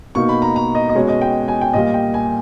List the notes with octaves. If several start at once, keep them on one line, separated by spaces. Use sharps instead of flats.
B2 A#3 D#4 C#6
B5
A#5
A#5
D#5
D#5
B2 G#3 C#4 C#5
D#5
G5
G#5
G5
A#2 G3 A#3 D#5
G5
G#5